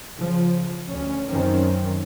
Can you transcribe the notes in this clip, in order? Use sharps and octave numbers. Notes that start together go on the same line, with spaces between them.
C#3 F3
D2 C#4
F#2 D#3 C4 C#4